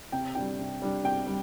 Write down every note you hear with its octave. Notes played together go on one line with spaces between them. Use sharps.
C3 G5
G3 D4 G5
C3
G3 D4
C3 G5
G3